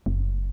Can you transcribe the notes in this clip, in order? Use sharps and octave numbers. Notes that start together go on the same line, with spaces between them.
F#1